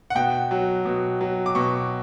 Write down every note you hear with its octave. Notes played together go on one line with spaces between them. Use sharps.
F#5
B2 G5
F#3
B2
F#3
D6
B2 C#6